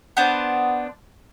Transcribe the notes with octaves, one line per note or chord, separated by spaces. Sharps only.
B3 D4 C5